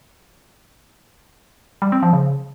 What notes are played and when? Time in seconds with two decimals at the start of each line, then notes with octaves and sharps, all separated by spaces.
1.82 G3
1.92 C4
2.03 F3
2.13 C#3